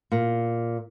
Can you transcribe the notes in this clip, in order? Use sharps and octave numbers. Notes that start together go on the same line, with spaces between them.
A#2